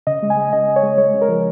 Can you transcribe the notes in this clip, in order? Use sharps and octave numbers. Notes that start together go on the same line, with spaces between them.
C#3 D#5
G#3
G#5
G#3
C#3 D#5
C#3
C#5
G#3
G#3 C#5
C#3
A#4
F3